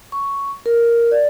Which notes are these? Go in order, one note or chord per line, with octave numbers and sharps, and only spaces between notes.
C#6
A#4
D5